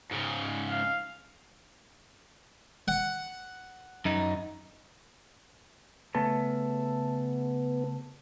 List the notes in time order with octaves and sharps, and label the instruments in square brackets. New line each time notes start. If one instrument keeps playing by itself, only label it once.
[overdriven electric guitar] G#2 C#3
[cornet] F5
[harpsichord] F#5
[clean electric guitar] F#2 D#4
[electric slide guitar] C#3 A3 A4 [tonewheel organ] B3